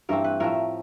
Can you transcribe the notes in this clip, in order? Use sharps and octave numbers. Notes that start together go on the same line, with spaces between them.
G2 E3 A3 C4 A#4
B4
A2 F3 A3 A#4